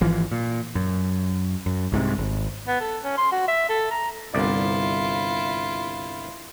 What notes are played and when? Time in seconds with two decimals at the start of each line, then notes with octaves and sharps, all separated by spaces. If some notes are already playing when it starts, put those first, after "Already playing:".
0.01 G#1 E3 F3
0.32 A#2
0.75 F#2
1.66 F#2
1.92 C2 G#2 C3
2.18 G#1
2.67 B3
2.80 A4
3.03 C#4
3.17 C6
3.32 F#4
3.48 E5
3.69 A4
3.90 A#5
4.34 G1 C2 E4 F4 D5